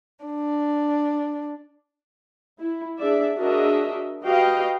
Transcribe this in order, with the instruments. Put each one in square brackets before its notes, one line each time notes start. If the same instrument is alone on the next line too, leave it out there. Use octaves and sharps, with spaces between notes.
[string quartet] D4
[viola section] E4
D4 G#4 D5 E5
D4 F#4 G#4 A#4 D#5 E5
F#4 G4 B4 D#5 F5 G5